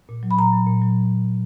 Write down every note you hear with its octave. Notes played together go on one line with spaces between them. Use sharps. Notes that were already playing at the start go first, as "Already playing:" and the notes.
A#2
F#3
B5
A#2 A#5
F#3
A#2
F#3